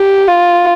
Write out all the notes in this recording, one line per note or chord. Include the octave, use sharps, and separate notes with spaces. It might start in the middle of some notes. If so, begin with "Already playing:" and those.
Already playing: G4
F4